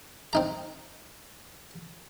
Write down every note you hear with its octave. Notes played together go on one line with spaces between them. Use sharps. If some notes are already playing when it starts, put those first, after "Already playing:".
C4 D#4 A#5